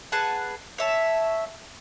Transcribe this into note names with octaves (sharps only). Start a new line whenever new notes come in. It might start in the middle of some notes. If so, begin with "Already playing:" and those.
G#4 B4 F#5 A5
C#5 E5 A5